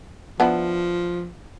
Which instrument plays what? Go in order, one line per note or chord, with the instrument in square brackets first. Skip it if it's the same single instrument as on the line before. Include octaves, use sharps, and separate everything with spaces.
[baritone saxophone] F3 [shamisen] B3 D4 E4